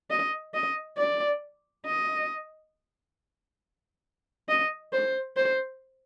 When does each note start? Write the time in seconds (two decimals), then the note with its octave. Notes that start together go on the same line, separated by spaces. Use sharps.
0.10 D#5
0.54 D#5
0.98 D5
1.86 D#5
4.49 D#5
4.93 C5
5.37 C5